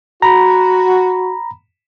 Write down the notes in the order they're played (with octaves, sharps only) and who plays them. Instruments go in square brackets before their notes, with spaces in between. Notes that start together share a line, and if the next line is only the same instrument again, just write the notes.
[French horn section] F#4 [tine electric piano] A#5 B5